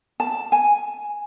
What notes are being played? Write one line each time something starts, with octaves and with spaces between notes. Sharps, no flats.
A5
G#5